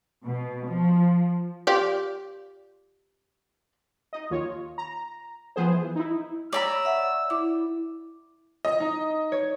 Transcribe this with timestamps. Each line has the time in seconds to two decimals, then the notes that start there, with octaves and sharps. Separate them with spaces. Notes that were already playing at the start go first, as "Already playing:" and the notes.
0.24 B2
0.66 F3
1.67 F4 G4 D5
4.13 D#4 D#5
4.30 D#2 F4 C#5
4.78 A#5
5.56 F3 B3 G#4 C5
5.73 E3
5.96 D#4 E4
6.53 C#5 D5 A#5 B5 E6
6.85 E5 F#5
7.30 E4 D6
8.65 D#5
8.80 D#4
9.32 C#5